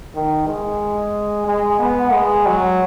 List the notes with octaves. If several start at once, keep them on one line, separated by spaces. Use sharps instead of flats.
D#3
G#3
G#3
B3
G#3
F#3